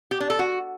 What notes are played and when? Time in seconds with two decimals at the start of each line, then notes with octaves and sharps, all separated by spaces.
0.11 G4
0.20 D4
0.30 A4
0.39 F#4